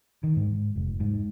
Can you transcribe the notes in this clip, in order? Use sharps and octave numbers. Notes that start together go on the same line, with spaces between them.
D#3
G#2
F1
G#2